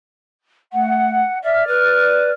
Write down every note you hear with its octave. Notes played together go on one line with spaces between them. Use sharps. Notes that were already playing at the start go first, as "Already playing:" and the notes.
A3 F#5
D5 E5 F6
B4